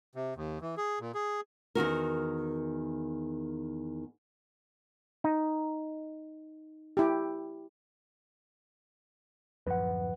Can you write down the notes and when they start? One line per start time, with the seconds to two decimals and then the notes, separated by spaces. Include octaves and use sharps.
0.15 C3
0.36 D#2
0.61 E3
0.77 G#4
1.00 A#2
1.15 G#4
1.75 E2 D#3 F#4 A#4
5.24 D#4
6.97 E4 G4
9.67 D1 F#2 F3 B4 F#5